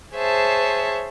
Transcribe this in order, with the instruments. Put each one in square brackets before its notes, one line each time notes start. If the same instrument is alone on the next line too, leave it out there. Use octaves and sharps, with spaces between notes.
[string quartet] G#4 C5 C#5 E5 A5